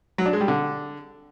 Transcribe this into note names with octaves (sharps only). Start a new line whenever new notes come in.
F#3
D4
G#3
G3
D3